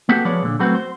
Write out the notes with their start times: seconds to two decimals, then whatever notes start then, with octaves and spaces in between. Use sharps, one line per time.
0.09 A#3 B3 F#4 G4 A4
0.25 F3 G#3 B4 C#5 D5
0.43 A#2 D3
0.60 F#3 A3 C4 F#4 B4
0.75 C5